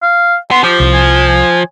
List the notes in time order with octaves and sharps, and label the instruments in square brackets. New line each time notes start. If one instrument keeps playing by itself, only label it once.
[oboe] F5
[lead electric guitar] B3 [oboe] C6
[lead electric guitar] F3 [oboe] G4
[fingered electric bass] C2
[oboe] G#5
G#5